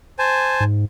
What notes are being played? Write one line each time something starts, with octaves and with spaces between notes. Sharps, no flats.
C5 G#5 A5
G#2